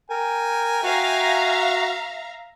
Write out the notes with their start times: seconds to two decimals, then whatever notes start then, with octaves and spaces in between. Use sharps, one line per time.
0.10 A#4 G5 G#5
0.84 F#4 E5 F5 A#5